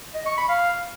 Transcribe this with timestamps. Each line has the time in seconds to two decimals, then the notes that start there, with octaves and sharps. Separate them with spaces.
0.14 D#5
0.26 C#6
0.37 B5
0.49 F5